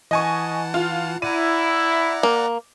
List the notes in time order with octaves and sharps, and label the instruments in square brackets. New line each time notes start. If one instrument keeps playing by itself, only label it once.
[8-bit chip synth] E3 F#5 A5 [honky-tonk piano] D#5 G#5 C#6
[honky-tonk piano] F4
[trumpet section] E4 [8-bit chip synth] D5 F#5 A#5 [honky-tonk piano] D#7
[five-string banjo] A#3